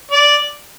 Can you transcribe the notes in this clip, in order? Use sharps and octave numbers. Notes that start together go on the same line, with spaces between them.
D5